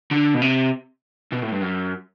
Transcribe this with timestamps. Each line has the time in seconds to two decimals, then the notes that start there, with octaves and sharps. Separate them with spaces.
0.11 D3
0.34 B2
0.42 C3
1.32 B2
1.42 A2
1.52 G2
1.61 F#2